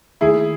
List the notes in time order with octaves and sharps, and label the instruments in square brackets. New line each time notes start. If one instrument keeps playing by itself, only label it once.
[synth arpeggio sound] D#2 D#3 A3 [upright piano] E4 G#4